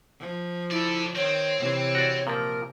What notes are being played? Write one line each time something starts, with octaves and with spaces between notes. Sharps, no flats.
F3
E4 A4 D5
D#3 C4 C#5
C3 E3
F#4 D5
A#2 F3 A#4